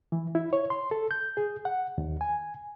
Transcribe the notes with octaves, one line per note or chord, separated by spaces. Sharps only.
E3
E4
C#5
C6
A4
G6
G#4
F#5
D#2
G#5